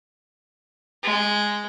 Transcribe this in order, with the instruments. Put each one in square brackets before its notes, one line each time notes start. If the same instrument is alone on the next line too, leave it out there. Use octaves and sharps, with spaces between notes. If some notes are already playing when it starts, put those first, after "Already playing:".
[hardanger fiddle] G#3